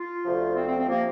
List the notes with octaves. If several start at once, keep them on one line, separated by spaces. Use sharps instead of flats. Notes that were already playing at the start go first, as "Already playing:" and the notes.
Already playing: F4
D2 C3 F3
C4
C4
C4
C3 F3 A#3